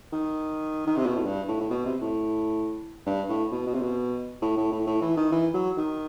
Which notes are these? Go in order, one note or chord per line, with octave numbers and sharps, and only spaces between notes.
D#3
D#3
C3
B2
A2
G2
A2
A2
B2
C3
A2
G2
A2
B2
B2
C3
B2
A2
A2
A2
A2
E3
D#3
E3
F#3
D#3